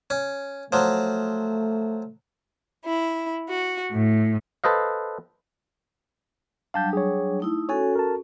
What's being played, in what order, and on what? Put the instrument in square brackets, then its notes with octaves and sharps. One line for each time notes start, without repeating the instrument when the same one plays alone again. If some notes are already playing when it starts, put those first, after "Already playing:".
[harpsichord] C#4
[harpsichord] F3 F#3 [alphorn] A3
[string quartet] E4
F#4
A2
[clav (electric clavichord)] A4 B4 C5 D#5 F5
[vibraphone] F#3 G3 D4 [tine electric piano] F5 A5 G6
[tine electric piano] G#4 C#5
[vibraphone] A3 D#4 E4
[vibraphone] C#4 F#4 A4 [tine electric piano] C#5 G#5
[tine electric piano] A#4 A5